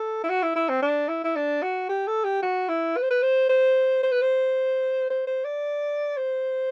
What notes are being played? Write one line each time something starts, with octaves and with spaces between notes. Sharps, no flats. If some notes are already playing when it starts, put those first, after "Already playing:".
Already playing: A4
E4
F#4
E4
E4
C4
D4
E4
E4
D4
F#4
G4
A4
G4
F#4
E4
B4
C5
B4
C5
C5
C5
B4
C5
C5
C5
D5
C5